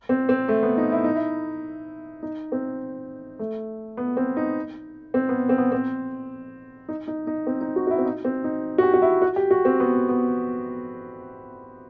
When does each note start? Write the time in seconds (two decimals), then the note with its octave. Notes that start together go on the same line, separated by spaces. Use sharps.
0.09 C4
0.29 C4
0.48 A3
0.63 B3
0.77 D#4
0.92 E4
1.04 D#4
1.15 E4
2.23 D#4
2.52 C4
3.39 A3
3.97 B3
4.17 C4
4.37 D#4
5.14 C4
5.29 B3
5.49 C4
5.58 B3
5.72 C4
6.89 D#4
7.08 D#4
7.27 D#4
7.47 C4
7.61 D#4
7.76 F#4
7.87 F#4
7.91 E4
7.98 C4
8.05 D#4
8.25 C4
8.44 D#4
8.78 F#4
8.83 G4
8.94 F#4
9.02 E4
9.22 F#4
9.36 G4
9.51 F#4
9.65 C4
9.80 B3
10.09 B3